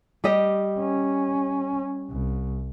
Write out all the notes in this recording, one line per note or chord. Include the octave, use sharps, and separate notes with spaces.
G3 G4 D#5
C#4
C2